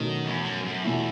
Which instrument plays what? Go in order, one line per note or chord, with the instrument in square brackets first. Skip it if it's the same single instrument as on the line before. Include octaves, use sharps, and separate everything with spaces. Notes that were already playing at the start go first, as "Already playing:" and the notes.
Already playing: [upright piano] B2 F#3 A3 C#4 [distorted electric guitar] D#3
[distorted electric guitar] E2
F#2
F#2
[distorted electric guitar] E2 [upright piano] B2 A3 E4